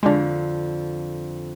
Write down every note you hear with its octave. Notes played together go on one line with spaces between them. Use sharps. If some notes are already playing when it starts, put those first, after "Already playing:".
F2 D3 G#3 D4 F4